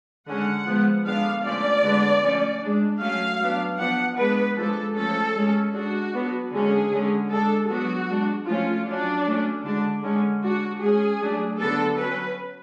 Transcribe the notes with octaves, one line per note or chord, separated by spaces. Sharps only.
D3 G#3 C#4 F#5
F3 G#3 B3
D3 G#3 B3 D4 F5
D3 F3 A3 C#4 D5
D3 G#3 B3 D4
F3 A3 C#4
G#3 D4
F#3 A3 C#4 F5
F#3 B3 D4
F3 B3 D4 F#5
G#3 B3 D4 B4
F3 G#3 D4 A4
F3 A3 C#4 A4
G#3 C#4
G#3 D4 F#4
F#3 B3 D4
D3 G#3 C#4 G#4
D3 G#3 C#4
G#3 D4 A4
F#3 B3 D4 F#4
G#3 D4
F3 A3 C#4 F4
F#3 C#4 D4
F#3 A3 C#4
D3 G#3 D4
D3 G#3 C#4
G#3 D4 F#4
G#3 C#4 G#4
F#3 A3 D4
D3 F#3 B3 D4 A4
F#3 C#4 B4